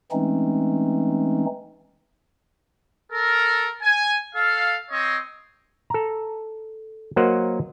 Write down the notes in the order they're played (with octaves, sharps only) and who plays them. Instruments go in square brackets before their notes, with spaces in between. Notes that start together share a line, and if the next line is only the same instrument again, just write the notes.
[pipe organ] E3 G#3 A3 C4 C#4 D#4
[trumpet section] A4 A#4
G#5
A4 F5
C4 C#5 D#5
[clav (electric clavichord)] A4 A#5
F#3 A#3 A#4 C5 D#5 F#5